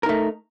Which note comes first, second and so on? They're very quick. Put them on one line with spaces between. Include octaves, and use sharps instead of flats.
A#4 D#4 A3